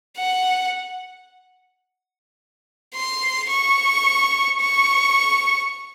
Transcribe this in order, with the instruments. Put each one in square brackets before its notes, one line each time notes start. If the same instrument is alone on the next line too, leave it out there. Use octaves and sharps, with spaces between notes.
[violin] F#5
C6
C#6
C#6